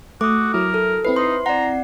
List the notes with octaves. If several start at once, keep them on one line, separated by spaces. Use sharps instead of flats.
A3 F#4 D6 D#6
F#3 E4 A#4
A4
C4 E4 B4 C7
D#4 C6
D5 F#5 A#5